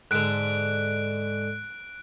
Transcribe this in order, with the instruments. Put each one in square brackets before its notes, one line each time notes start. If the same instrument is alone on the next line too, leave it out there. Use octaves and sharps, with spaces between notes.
[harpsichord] G#2 D3 [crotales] F#6 D7